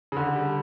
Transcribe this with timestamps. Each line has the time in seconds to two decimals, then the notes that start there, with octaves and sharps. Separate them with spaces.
0.12 C#3
0.17 D3
0.36 G3